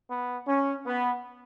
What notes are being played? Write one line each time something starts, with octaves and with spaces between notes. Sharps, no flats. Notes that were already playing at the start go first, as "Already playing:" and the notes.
B3
C#4
B3